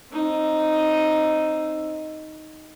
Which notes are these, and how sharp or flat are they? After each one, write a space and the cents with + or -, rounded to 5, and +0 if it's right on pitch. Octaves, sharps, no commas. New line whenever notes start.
C4 +20 D#4 +0